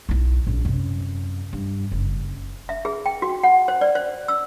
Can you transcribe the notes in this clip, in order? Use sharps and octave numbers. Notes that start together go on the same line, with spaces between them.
B1 E4
A#1 F#2
F#2 C3
G2
F#1
E5
G#4
G5
F#4
F#5
C5
D5
C5
E6